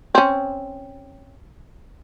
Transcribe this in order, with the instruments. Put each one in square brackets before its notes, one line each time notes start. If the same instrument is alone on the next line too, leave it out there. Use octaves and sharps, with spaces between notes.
[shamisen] C4 C#4